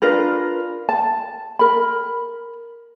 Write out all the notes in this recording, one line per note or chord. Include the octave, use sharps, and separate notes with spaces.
D4 F4 A#4 B4
A5
A#4 B5